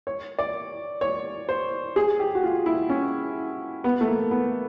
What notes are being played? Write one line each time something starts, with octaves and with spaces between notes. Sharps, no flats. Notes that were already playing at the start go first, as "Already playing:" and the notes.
C#5
D5
C#5
C5
G#4
G4
F#4
F4
E4
C#4
B3
A3
A#3
B3